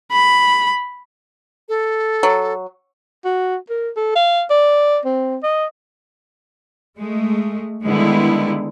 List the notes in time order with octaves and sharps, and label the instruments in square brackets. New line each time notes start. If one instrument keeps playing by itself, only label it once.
[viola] B5
[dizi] A4
[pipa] F#3
[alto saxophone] F#4
A#4
A4
F5
D5
C4
D#5
[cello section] G#3 A3
D3 D#3 G3 G#3 B3 E4